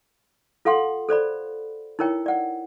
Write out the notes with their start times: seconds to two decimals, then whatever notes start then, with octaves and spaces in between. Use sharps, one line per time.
0.65 F4 A4 F5 F#5 C6
1.09 A4 C5 D5 B5
1.99 D#4 E4 A#4 C#5 G5
2.26 D5 F#5